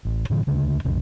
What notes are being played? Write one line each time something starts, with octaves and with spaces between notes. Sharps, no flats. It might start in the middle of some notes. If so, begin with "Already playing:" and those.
A1
A2 D3 E3
D2 C#3 D4
B1 F2 C3